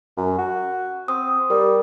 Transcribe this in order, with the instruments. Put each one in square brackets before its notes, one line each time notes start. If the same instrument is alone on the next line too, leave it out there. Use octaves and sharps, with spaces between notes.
[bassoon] F#2
F#4
[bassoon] C4 [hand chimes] D#6
[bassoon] G3 [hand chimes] A#4